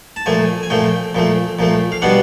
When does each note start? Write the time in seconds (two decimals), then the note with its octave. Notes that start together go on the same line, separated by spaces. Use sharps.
0.16 A5
0.26 A#2 F3 A3 G#5
0.63 G#5
0.70 A#2 F3 A3 G5
1.15 A#2 F3 A3
1.59 A#2 F3 A3
1.92 F5
2.02 B2 G3 B3 D4 F#5